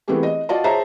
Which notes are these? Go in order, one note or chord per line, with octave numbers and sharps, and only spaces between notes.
E3 A3 B3 C4 G4 G#4
D#5
F4 F#4 D5 D#5 F5 A5
G#4 C5 C#5 E5 A5 A#5